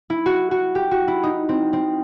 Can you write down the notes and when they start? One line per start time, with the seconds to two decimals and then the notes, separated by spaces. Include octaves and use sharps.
0.10 E4
0.26 F#4
0.51 F#4
0.75 G4
0.91 F#4
1.08 E4
1.23 D#4
1.49 C4
1.73 C4